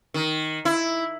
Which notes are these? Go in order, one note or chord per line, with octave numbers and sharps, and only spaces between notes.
D#3
E4